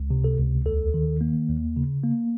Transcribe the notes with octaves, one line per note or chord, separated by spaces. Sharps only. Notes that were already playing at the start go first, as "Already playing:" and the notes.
Already playing: C#2
C3
A4
C#2
D#2 A4
D#3
A#3
D#2
C#3
A#3